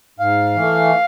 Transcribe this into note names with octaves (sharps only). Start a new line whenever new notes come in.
G#2 F5
E3 A3